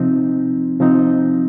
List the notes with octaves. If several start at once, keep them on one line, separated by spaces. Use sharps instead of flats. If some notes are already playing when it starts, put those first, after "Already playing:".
Already playing: C3 F3 C4 D#4
C3 F3 C4 D#4